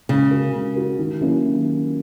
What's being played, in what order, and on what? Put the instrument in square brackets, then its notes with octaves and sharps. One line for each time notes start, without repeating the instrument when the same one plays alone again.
[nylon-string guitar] C#3 [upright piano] G#3
[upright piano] C#4 F#4 A#4
G#3
C#4 F#4 A#4
D#3
F#3 A#3 C#4 E4
D#3